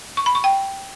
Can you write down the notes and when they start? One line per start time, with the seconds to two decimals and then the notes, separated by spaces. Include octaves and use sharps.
0.17 C#6
0.26 B5
0.35 C#6
0.44 G5